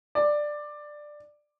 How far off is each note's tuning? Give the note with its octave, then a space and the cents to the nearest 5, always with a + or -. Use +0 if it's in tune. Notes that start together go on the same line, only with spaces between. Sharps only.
D5 +10